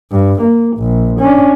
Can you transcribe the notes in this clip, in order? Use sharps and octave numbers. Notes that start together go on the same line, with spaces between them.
G2
A#3
A#1
C#4 D4